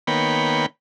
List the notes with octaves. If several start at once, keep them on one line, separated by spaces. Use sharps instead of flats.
D#3 A#3 B3 C#5 G5 B5